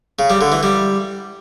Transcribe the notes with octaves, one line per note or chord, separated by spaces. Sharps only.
C#3
G3
D3
E3
G3